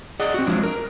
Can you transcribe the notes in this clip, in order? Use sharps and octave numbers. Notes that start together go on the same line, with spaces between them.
G#4 D5 D#5 F#5
C4 F#4
F3 F#3 G#3 D4
A#4